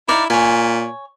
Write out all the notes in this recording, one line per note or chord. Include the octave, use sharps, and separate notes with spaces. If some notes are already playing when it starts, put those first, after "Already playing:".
D#4 E4 D5 F5
A#2 C#5 G#5